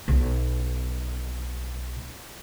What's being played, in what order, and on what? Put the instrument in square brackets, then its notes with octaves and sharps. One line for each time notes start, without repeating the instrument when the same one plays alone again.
[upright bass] B1 B2